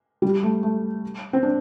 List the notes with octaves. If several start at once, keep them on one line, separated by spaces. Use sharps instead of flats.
G3
A3
A3
C4
D4